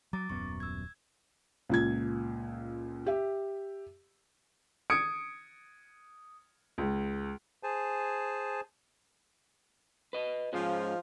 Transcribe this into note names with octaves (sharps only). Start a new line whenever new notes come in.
F#3 A#5 D6 A6
D#1 F#2 B3 C#6
E6 G#6
C#2 A#2 G#6
G4 E5
D#6 G#6 C#7 D7
C#2
G#4 C5 G#5 A5
B4 D#5
G#2 F3 G#3 C#4 F4